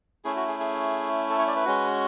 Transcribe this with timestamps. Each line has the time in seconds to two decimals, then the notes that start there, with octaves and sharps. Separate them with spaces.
0.25 A3 C#4 E4 G#4
0.36 F#4
0.48 G#4
0.60 G#4
1.30 A4
1.38 C#5
1.48 D5
1.56 B4
1.65 G#3 C#4 F#4